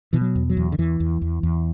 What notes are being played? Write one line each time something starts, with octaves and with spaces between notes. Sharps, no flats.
B2 E3
F#3
E2
F#3
E2
D3
E2 E3
E2
E2
E2